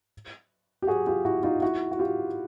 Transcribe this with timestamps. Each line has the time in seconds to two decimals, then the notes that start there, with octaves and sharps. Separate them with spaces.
0.82 G4
0.87 F#4 G#4
1.07 F4 G4
1.25 E4 F#4
1.43 D#4 F4
1.62 E4 F#4
1.91 F#4
1.99 F4 G4